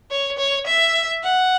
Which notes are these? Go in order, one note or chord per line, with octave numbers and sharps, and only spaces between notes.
C#5
C#5
E5
F#5